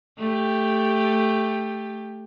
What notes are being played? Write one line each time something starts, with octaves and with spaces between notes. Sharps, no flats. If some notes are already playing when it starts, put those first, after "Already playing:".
A3 G4